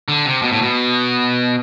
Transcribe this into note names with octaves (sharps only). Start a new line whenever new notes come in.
D3
C3
B2
A2
B2